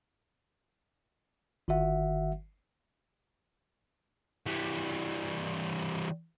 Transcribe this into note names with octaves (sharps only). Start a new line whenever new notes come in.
G1 D#3 F#4 E5 F#5
E3 G3